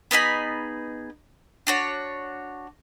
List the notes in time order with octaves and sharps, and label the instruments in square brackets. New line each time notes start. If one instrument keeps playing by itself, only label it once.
[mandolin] B3 D#4 G#4 B5
D4 F#4 C#5